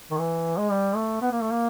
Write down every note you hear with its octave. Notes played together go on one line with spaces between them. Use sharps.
D#3
E3
G#3
G3
A3
B3
A#3
A3
A#3